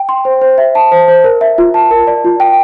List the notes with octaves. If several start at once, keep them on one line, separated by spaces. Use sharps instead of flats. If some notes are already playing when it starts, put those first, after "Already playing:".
Already playing: G5
C6
C5
C5
E5
A5
C5
C5
A#4
E5
F4
A5
A#4
D5
F4
G5